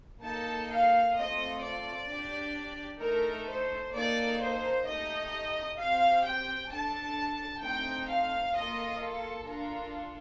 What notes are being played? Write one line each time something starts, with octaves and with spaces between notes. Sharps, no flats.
A#3 D#4 A4 A5
F5
A3 C4 F4 A4 D#5
D5
D4 G4
A3 D#4 A4 A#4
C5
A#3 D#4 A4 D5
C5
A3 D#4 G4 D#5
C4 G4 F5
G5
D4 A4 A5
A3 C4 D#4 G5
F5
A#3 F4 A4 D#5
A4
D4 F4 A4 A#4